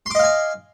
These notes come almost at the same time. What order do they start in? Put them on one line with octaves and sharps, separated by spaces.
C6 D6 D#5 F5 G#5